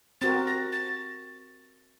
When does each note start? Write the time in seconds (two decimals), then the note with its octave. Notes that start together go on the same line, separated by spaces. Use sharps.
0.21 C4 F#4 A#4 A6
0.47 A#6
0.72 A6